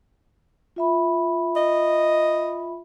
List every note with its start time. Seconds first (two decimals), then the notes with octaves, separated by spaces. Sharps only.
0.76 F4 E5 B5
1.56 D#5